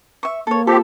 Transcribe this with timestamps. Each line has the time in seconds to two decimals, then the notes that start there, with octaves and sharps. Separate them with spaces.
0.23 E5 C#6
0.47 A#3 A4 C#5
0.67 C4 F4 G4 A4